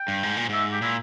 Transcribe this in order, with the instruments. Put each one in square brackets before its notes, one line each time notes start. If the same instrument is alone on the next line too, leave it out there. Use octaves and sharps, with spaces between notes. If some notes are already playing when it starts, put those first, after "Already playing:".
Already playing: [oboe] G5
[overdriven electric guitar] G2
G#2
A#2
[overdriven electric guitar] G#2 [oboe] E5
[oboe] G4
[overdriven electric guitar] A#2 [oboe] E4